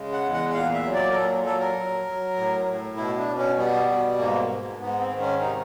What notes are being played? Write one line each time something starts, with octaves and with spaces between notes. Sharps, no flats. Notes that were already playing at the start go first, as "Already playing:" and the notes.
Already playing: C#3 G#3
F#5
E2
F#5
F#5
A#2 F5
E5
F#3
D5
A#4
A#2 A4
F#3 A4
A#4
F#3
F#3
A2
A2
B2 E4
D4
B2
C#4
G3 B3
B2
G#2 A#3
G#2
G#2 B3
C4
D#3
C#4
C3 D#4